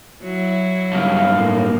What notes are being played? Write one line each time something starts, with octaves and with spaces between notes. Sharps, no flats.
F#3 E4
G2 C#3 F5
A2 A#3